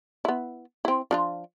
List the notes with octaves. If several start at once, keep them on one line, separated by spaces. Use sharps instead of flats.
B3 E4
C4 E4
F3 D4 F4